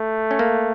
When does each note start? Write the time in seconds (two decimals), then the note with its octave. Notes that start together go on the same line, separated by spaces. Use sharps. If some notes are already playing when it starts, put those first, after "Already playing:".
Already playing: A3
0.31 C#4
0.39 A#3